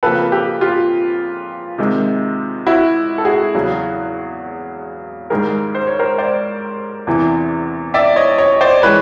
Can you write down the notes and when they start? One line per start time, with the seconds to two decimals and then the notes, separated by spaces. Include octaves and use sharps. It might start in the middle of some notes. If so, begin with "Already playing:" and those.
0.03 F2 C#3 F3 A#3 A4 B4
0.32 G4 A4
0.61 F4 G4
1.78 C3 D#3 G#3
2.66 E4 F#4
3.18 A4
3.25 F#4 G#4
3.54 E2 C#3 F#3
5.30 G#2 D#3 G3 G#4 A#4
5.75 C5
5.87 C#5
5.99 A#4 C5
6.18 C5 D5
7.07 E2 C3 E3
7.94 D5 E5
8.16 C#5 D#5
8.38 C#5 D#5
8.61 C5 D5
8.82 E3 G#3 B4 C#5